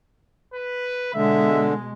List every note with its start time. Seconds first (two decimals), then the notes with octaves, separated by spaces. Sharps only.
0.54 B4
1.14 B2 D3 G#3 E5